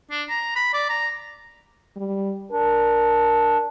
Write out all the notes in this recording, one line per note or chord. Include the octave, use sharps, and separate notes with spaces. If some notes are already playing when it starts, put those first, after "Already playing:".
D4
A#5
B5
D5
A#5
G3
D4 A#4